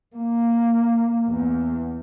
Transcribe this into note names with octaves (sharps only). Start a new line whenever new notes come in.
A#3
E2